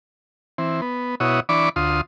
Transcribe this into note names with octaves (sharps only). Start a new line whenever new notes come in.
E3 C4
B3
B2 E4 F#4 C#5 D#6
E3 D4 D5 B5 C#6 D6
D2 F4 C6 D#6